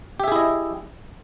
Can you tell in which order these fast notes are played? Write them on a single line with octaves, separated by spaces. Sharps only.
G4 E5 G#4 E4 D#5